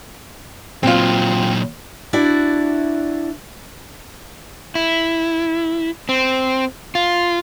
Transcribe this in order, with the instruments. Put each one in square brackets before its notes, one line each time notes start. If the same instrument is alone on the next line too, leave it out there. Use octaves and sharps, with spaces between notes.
[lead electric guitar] A#2 F#3 [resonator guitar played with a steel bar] C4 F4
[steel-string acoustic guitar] D4 E4 F#4 D5
[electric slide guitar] E4
C4
F4